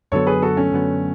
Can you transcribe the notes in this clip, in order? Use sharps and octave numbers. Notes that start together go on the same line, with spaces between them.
F#2 D3 F#3 B3 A4 C#5
G#4 B4
F#4 A4
A3 C#4
F#2 D3 F#3 B3